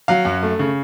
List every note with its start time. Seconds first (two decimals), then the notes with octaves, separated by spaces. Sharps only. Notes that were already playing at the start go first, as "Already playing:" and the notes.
0.08 F#3 F5
0.25 F#2
0.43 A3
0.59 C#3